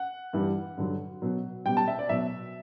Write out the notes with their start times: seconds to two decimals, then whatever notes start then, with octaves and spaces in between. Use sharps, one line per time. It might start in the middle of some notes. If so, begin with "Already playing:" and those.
Already playing: F#5
0.33 G2 E3 G3
0.77 G2 D3 F#3
1.22 B2 F#3
1.66 B2 G3 G5
1.77 A5
1.88 E5
1.99 D5
2.09 B2 F#3 E5